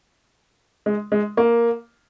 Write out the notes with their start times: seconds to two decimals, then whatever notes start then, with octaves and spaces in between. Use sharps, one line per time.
0.86 G#3
1.12 G#3
1.37 A#3